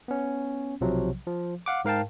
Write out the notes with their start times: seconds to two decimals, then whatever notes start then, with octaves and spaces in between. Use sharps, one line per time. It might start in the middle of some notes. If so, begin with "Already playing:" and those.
0.08 B3 C#4
0.81 B1 C3 F3 F#3
1.27 F3
1.66 F5 F#5 D6
1.85 G#2 A#4 F5 G5 A5